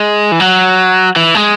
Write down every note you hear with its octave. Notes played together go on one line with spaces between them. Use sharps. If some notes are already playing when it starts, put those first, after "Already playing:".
Already playing: G#3
E3
F#3
E3
G#3